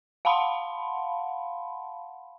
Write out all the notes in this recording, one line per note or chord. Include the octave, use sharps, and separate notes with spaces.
F5 F#5 A5 B5 C6